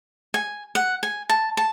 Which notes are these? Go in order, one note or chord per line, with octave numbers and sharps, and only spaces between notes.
G#5
F#5
G#5
A5
A5